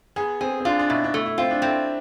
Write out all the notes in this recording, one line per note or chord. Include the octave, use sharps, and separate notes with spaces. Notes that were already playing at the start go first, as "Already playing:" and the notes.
B3 G#4
C4 G#4
C4
D4 F4
D4
B2 E4
D4
A3 E4
E4
C4 F4
D4
C4 E4